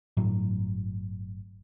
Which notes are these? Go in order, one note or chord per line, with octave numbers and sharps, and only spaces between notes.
G1 A2 F#3